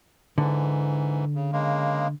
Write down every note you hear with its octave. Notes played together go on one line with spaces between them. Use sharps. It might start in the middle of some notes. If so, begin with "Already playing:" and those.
G#2 D3 E3
C#3
C#3 G#3 A#3